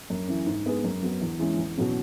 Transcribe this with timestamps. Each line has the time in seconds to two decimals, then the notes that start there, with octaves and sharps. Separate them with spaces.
0.10 F#2
0.28 E3 C#4
0.46 G#2
0.65 G#3 B3 G#4 B4
0.84 F#2
1.02 F#3 B3
1.21 E2
1.39 E3 G#3 C#4
1.58 E2
1.76 B2 F#3 C#4